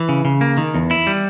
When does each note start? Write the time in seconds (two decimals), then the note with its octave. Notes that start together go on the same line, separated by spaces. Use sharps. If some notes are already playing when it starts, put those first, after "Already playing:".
Already playing: E3
0.09 C#3
0.25 C#3
0.41 A#3
0.57 D#3
0.74 E2
0.91 E4
1.07 G3